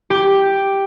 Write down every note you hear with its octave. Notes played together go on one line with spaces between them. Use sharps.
G4